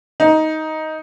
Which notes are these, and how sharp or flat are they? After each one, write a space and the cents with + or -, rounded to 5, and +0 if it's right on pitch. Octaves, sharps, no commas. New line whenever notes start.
D#4 +10